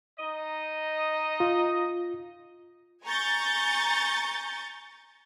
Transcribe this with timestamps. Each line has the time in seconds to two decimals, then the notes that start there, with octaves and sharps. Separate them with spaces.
0.19 D#4 D#5
1.40 F4
3.06 G#5 A#5 C#6 G6 A6